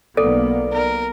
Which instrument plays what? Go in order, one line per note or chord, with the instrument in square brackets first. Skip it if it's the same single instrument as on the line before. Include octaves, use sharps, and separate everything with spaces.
[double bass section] B1 A#3 B3 [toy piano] A4 [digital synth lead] D5
[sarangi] A#4